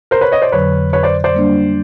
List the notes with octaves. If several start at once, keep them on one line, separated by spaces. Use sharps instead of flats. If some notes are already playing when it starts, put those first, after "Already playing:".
A#4 C5
B4 C#5
C#5 D#5
C5 D5
F2 D3 F#3 B4 C#5
B4 C#5
C5 D5
C5 D5
G3 A#3 D4